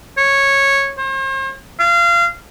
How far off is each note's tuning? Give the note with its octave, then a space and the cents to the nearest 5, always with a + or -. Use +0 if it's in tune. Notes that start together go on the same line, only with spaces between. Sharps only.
C#5 -10
C5 +45
F5 -25